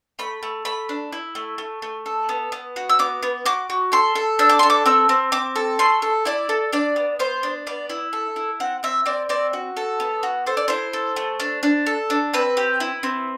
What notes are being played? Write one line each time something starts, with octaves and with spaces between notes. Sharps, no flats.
A3 B5
A3
A3 B5
D4
E4
A3
A3
A3
A4
B3
B3
F#4
E6
B3 D6
B3
F#4 D6
F#4
A4 C6
A4
D4 E6
D6
A4 C6
D6
C4 E6
C4
C4 D6
A4
A3 C6
A4
E4 D5
A4
D4 D5
B3
B3 C5
D4
B3 D5
E4
A4
E4
C4 F#5
C4 E5
C4 D5
C4 D5
F#4
A4
B3
F#4
A4 C5
D5
E4 C5
A4
A3
D4
D4
A4
D4
C4 B4
G4
E4
C4